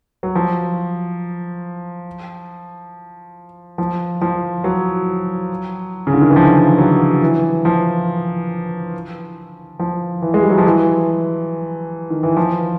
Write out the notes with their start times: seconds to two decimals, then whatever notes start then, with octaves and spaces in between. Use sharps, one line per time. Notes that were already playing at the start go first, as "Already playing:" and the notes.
0.23 F#3
0.35 F3
3.78 F3
4.21 F3
4.64 F#3
6.07 C#3
6.14 D3
6.21 D#3
6.29 E3
6.36 F3
6.78 F#3
7.22 E3
7.65 F3
9.79 F3
10.22 E3
10.34 G#3
10.42 G3
10.50 F#3
10.58 F3
10.65 E3
12.10 D#3
12.23 E3
12.37 F3